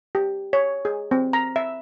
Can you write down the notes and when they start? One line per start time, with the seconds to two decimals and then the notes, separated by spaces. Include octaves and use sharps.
0.15 G4
0.53 C#5
0.85 G#4
1.11 C4
1.33 A#5
1.56 E5